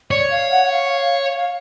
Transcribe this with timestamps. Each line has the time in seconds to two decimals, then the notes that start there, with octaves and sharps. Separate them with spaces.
0.11 C#5 D5
0.31 F5
0.51 F#5
0.64 F#5
0.71 F5
0.92 F5
1.36 F5